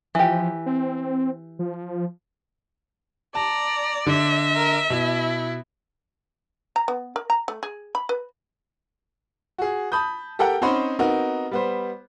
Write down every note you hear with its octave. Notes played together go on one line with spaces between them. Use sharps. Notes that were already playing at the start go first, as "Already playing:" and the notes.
E3 F3 G4
C4
F3
D5 A5 A#5
D3 D#5 E5
A#4
B2 E4
A#5
B3
A#4
A#5
A3
G#4
B5
B4
F#4 G#4
A5 B5 D#6 G6
G4 A4 A#4 F#5 G5 A#5
C4 C#4 D#4 C5 F#5 B5
B3 C4 D#4 F#4 A#4
G3 B3 C5